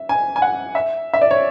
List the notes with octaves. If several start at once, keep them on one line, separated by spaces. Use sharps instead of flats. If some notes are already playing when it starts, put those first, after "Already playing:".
Already playing: E5
G#5
G#5
F#5
E5
E5
D5
C#5